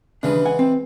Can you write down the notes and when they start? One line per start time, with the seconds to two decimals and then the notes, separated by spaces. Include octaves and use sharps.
0.23 D#2 C#3 E3 G#3 D4 B4
0.45 F#5 G#5
0.59 C4